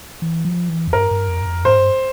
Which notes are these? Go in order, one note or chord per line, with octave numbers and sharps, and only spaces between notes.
E3
F3
E3
F2
G2 A#4
G2
F2
G2
F2
G#2 C5
G2